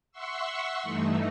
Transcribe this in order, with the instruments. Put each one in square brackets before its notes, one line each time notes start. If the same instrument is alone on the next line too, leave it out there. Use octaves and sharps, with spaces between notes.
[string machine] E5 F#5 C6 C#6 E6
G2 E3 A3 D#4